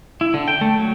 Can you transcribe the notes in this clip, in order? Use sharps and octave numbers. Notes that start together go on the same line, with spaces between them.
E4
D3
G5
A3
F#3